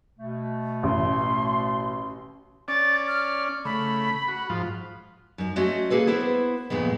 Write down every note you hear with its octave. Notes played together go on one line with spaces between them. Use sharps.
B2 A3
A1 C6
C#4 D5 A6
F6
C#3 A3 B5
F#4
G#2 F3 F4
F#2 D#4
G#3 A3 C#4 F#4 D#5
A#3 G#4 A4 B4
B3 E4 B4 C5
F2 A#2 C#3 G#3 B3